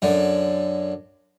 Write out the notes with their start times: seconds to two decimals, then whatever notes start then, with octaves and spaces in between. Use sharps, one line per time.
0.02 F#2 D3